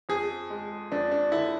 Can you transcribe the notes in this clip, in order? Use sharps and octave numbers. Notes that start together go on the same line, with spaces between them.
F2 G#4
G#3
F2 D4
D4
D3 E4